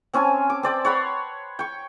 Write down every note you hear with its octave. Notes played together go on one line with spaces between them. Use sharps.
C4 C#4 G#5 A5
D6
C4 D5 G5
C#5 F#5 B5 C6
G5 C#6